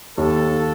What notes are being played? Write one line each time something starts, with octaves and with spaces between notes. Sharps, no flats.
D#2 A4